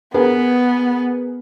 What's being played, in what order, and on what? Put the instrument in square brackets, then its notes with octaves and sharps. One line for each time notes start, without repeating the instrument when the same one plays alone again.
[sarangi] B3 [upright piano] G#4 A#4 B4